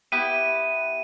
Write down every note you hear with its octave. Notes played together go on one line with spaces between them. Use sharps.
B3 E4 G4 D#7